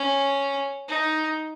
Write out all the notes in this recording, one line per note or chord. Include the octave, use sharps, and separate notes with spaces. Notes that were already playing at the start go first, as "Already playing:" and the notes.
Already playing: C#4
D#4